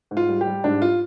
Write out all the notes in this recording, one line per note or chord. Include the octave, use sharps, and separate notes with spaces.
G#2
F4
G3
G4
G3
G#2 D4
F4